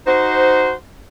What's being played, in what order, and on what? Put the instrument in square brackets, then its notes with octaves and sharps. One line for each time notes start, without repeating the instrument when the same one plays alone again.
[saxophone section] D#4 F#4 C5